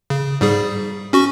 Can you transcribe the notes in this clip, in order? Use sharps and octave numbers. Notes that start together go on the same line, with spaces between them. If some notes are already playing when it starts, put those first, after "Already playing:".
C#3
G#2 G3 G#4
C#4 F#4 C#6